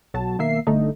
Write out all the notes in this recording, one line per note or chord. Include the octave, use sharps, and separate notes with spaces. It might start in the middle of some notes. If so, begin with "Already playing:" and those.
B1 F#3 A5
B1 D#3 A#3 E5 C7
G1 D3 A3 D#4